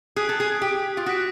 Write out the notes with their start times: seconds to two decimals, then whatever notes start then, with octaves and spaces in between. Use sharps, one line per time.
0.16 G#4 D#6 F#6 B6 D7
0.29 A4
0.40 G#4
0.62 G4
0.97 F4
1.06 F#4 D#6 F#6 B6 D7